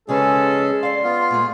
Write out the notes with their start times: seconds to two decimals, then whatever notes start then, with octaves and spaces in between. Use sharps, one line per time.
0.09 C#3 F3 G#3 C#4 G#4 A4 B4
0.83 D5 F5 C6
1.04 B3 F4
1.31 A#2 G#3 A3